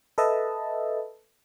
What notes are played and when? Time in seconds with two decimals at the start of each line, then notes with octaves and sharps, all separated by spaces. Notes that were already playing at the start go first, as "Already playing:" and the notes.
0.18 A4 B4 D#5 E5 A5